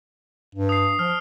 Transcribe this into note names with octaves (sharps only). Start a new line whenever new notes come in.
G2
D#6 C7
F3 F6